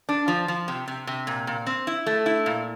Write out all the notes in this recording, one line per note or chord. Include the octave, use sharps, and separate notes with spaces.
D4
F3
F3
C3
C3
C3
A#2
A#2
C4
E4
A3
E4
A#2